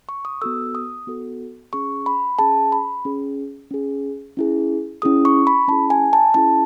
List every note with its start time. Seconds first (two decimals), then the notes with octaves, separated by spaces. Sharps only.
0.09 C#6
0.25 D#6
0.42 B3 F#4 A4 E6
0.75 D#6
1.07 B3 F#4 A4
1.73 C#4 G#4 C#6
2.06 B5
2.39 C#4 G#4 A5
2.72 B5
3.05 C#4 G#4
3.71 C#4 G#4
4.37 C#4 E4 G#4
5.02 C#4 E4 G#4 D#6
5.25 C#6
5.47 B5
5.68 C#4 E4 G#4 A5
5.90 G#5
6.13 A5
6.34 C#4 E4 G#4 A5